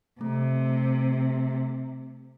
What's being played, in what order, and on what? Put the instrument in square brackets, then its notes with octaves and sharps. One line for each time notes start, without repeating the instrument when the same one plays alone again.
[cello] C3 [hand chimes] A3